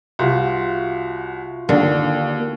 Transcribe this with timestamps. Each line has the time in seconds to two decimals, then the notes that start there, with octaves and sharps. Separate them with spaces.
0.19 C2 F4 F#4
1.69 D#2 D3 A#3